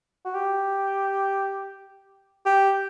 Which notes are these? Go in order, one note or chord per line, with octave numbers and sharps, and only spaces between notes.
F#4
G4
G4